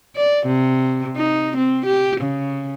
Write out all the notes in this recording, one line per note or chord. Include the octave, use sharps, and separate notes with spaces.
D5
C3
D#4
C4
G4
C#3